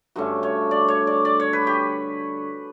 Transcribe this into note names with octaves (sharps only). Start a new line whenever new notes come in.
G2 D3 A3 C#4 F#4
C#5
D5
C#5
D5
D5
C#5
B4
G4